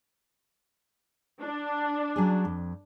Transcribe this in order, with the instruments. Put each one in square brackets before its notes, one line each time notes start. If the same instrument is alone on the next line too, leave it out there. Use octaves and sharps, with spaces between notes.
[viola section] D4
[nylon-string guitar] F#3 C#4 G#4
F2